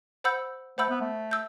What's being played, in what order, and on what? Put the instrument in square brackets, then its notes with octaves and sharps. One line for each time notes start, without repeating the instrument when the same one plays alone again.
[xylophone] C5 F#5 B5 E6 G6
[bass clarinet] A3 [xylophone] C5 F#5 B5 E6 G6
[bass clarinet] B3
A3
[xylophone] E6 G6